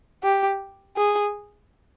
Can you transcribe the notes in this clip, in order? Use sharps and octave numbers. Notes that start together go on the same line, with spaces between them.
G4
G#4